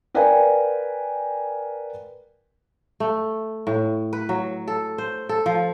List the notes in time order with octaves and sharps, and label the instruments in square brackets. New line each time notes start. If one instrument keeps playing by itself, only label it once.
[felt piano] A#4 B4 D5 F5 G5 G#5
[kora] A3
A2
B4
F#3
A4
C5
A4
F3